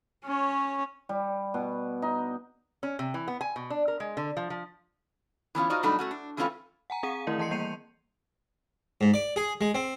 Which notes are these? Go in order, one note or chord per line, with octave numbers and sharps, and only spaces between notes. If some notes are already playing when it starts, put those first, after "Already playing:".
C#4 C#5
G3
B2
D#4
C#4
C3
E3
B3
G#5
B2
D4
A#4
G#3
D3
F3
F3
E3 B3 C#4 F4
D#4 F4 F#4 C5 D5 D#5
B2 F#3 G3 A3 D4 D#4
A3 C#4 F#4
D4
E3 A3 C4 C#4 F4 B4
F#5 G#5 A#5
C4 G#4 F5 F#5 D#7
D#3 A3 E4 A#4 D#5
E3 D#5 A5 C6 C7 C#7
G3 A#3 G6 C7 D#7 F7
G#2
D5
G#4
G#3
C4